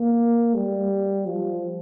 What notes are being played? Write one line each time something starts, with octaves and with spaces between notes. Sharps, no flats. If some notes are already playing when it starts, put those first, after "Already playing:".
Already playing: A#3
G3
F3